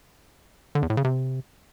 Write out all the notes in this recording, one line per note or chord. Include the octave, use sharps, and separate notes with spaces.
D3
E2
A2
C#3
C3